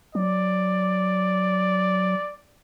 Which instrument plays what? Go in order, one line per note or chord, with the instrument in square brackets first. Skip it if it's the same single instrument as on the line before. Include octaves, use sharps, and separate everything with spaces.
[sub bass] F#3 [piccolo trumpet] D5